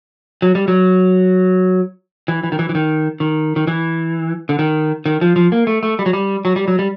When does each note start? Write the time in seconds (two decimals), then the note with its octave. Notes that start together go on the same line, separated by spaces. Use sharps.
0.42 F#3
0.55 G3
0.68 F#3
2.28 E3
2.44 E3
2.52 D#3
2.59 E3
2.69 E3
2.75 D#3
3.20 D#3
3.56 D#3
3.67 E3
4.49 D3
4.59 D#3
5.06 D#3
5.21 F3
5.36 F3
5.52 A#3
5.67 A3
5.83 A3
5.99 G3
6.06 F#3
6.13 G3
6.45 F#3
6.56 G3
6.68 F#3
6.79 G3